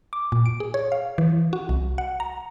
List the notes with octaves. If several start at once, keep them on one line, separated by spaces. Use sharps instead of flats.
D6
A#2
D7
G#4
C#5
F5
E3
F#4
C2
F#5
A#5